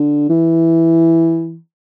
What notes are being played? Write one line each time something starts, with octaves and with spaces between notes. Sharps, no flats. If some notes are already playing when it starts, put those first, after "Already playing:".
Already playing: D3
E3